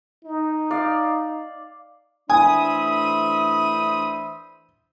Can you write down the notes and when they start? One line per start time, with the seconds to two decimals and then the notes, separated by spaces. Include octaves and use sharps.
0.24 D#4
0.71 D5 F5
2.30 E3 A3 D4 C5 E5 G#5 B5 D#6